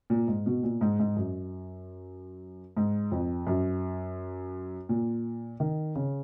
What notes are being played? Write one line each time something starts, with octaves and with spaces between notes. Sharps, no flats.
A#2
G#2
B2
A#2
G#2
G#2
F#2
G#2
F2
F#2
A#2
D#3
C#3